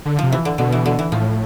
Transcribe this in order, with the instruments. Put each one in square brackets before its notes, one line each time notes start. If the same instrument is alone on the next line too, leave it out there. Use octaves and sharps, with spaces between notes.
[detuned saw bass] D3
[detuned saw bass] C3 [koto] F3
[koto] E3
D3
[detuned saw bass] B2 [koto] D3
[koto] E3
D3
E3
[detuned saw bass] A2 [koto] F3